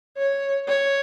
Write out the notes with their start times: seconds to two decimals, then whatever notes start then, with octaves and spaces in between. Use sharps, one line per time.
0.17 C#5
0.68 C#5